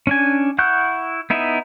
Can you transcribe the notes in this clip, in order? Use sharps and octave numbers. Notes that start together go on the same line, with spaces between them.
C#4 D4 G#5
E4 F#5 C#6 F#6 G6
B3 D#4 E4 E5